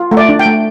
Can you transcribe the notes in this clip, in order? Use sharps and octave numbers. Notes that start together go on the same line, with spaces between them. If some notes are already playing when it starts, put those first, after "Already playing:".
Already playing: F4
A3
D5
D4
G5
A3